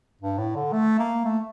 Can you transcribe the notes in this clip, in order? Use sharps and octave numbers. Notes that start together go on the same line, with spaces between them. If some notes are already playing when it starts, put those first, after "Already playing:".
G2
A2
D3
A3
A#3
A3